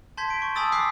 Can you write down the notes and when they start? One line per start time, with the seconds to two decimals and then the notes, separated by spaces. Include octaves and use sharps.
0.17 A5 C6 G6 G#6 B6
0.30 D7
0.42 C#6
0.55 G#5 A5 B5 D#6 E6 A6
0.72 D6 E6 F#6 B6 C7